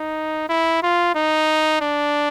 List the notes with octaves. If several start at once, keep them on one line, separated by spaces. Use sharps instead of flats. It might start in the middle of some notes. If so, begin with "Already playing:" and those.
Already playing: D#4
E4
F4
D#4
D4